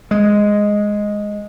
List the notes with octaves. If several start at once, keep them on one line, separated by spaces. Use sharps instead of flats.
G#3